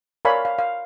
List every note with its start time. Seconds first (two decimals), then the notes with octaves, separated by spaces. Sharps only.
0.25 A#4 C#5 D5 F5 G#5 B5
0.45 F5
0.59 F5